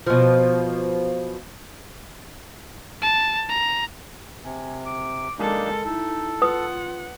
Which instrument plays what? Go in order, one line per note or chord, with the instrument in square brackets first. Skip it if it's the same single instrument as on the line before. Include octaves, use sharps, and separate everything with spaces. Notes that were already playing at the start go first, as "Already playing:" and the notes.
[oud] B2 F3
[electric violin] A5
A#5
[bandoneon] C3 [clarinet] G#5
[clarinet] D6
[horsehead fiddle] G#3 A4 [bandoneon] A#3 D4 D#4 [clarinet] A#4
[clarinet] D#4 [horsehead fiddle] E4 [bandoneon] A4
[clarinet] F4 [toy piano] B4 D#6 [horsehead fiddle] F#5